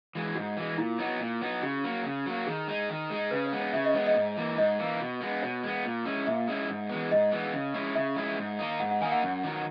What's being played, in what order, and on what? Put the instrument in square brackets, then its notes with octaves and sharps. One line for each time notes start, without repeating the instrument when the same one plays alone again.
[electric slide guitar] E3 G#3
[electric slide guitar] G#2 [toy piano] F#4
[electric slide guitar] E3 G#3
[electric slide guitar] A#2 [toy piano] E4
[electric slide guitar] F#3 B3 D#4
A#2
F#3 B3 D#4
[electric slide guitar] C#3 [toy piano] F#4
[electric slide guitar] F#3 A#3
C#3
F#3 A#3
[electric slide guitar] D#3 [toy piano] G#4
[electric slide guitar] G#3 D#4
D#3
G#3 D#4
[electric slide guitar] C#3 [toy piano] B4
[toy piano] C#5
[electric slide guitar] G#3 B3
[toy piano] C#5
[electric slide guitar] C#3 [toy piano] E5
[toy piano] D#5
[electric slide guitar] G#3 B3 [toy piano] C#5
[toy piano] D#5
[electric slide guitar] G#2
E3 A#3
[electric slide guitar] G#2 [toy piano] D#5
[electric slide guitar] E3 A#3
B2
G#3 B3
[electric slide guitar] B2 [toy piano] C#5
[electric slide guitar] G#3 B3
A#2
G#3 C#4 E4
[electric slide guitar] A#2 [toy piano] E5
[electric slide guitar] G#3 C#4 E4
G#2
E3 G#3 B3
[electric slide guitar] G#2 [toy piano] D#5
[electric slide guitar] E3 G#3 B3
C#3
G#3 C#4 E4
[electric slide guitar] C#3 [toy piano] E5
[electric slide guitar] G#3 C#4 E4
G#2
D#3 A#3 D#4
[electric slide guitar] G#2 [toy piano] F#5
[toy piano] F#5
[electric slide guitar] D#3 A#3 D#4 [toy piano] G#5
[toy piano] F#5
[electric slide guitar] F#2
D#3 F#3